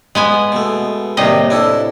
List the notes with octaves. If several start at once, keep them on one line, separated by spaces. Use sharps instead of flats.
G#3 B3 G#5
B2 A3
D#2 A2 C3 G3 D#5
D4 E4 A4